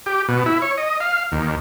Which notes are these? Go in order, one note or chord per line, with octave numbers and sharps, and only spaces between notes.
G4
B2
E4
C#5
D#5
F5
D#2